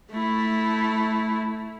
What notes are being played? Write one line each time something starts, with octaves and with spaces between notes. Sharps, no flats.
A3 E4